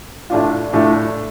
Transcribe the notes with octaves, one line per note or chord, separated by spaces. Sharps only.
A2 A3 D4 F4
A2 A3 D4 F4